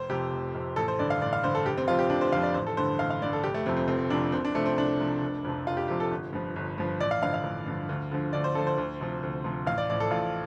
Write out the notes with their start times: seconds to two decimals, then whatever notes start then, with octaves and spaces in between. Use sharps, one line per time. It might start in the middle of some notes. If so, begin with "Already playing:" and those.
Already playing: F1 C5
0.09 F2 C3 G4
0.32 F1
0.54 F2 C3
0.76 A1 A4
0.88 C5
0.99 G2 D3 D5
1.10 F5
1.21 A1 D5
1.33 F5
1.43 G2 D3 C5
1.55 A4
1.65 F1 G4
1.78 C4
1.88 F2 F3 F4
1.99 G4
2.10 F1 D4
2.21 C5
2.33 F2 F3 F5
2.43 D5
2.54 A1 C5
2.67 A4
2.77 G2 D3 C5
2.99 A1 F5
3.10 F5
3.22 G2 D3 D5
3.33 A4
3.44 F1 G4
3.54 A3
3.66 F2 C3 F3 C4
3.77 C4
3.88 F1 C4
4.10 F2 C3 F3 D4
4.32 C2 C4
4.45 D4
4.55 C3 F3 A3
4.66 C4
4.77 C2 D4
5.00 C3 F3
5.22 F1
5.45 F2 C3 F3
5.67 F1 F4
5.77 G4
5.88 F2 C3 F3 G4
6.00 A4
6.11 G1
6.33 G2 F3
6.56 G1
6.78 G2 F3
7.01 A1 D5
7.11 F5
7.22 G2 D3 F3 F5
7.34 F5
7.44 A1
7.66 G2 D3 F3
7.89 D2
8.12 D3 F3
8.33 D2 D5
8.44 C5
8.55 D3 A4
8.59 F3
8.67 C5
8.78 D2
9.01 C3 F3
9.23 D2
9.44 C3 F3
9.67 A1 F5
9.78 D5
9.90 A2 F3 D5
10.00 A4
10.11 A1 F4